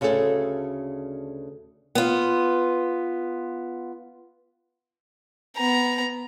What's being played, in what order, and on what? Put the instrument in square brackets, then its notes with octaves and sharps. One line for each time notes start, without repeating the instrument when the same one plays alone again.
[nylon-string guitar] D2 C#3 F#4 G#4 A4
[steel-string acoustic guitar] B3 F4
[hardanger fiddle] B3 A#5